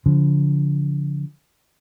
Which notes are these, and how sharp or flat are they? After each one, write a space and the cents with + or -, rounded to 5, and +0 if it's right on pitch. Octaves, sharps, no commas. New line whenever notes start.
D3 -40 F3 +0